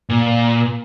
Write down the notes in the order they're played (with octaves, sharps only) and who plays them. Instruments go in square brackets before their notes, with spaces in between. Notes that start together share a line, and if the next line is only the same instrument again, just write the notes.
[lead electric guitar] A#2